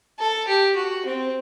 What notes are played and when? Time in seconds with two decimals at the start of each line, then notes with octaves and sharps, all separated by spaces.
0.20 A4
0.48 G4
0.76 F#4
1.06 C4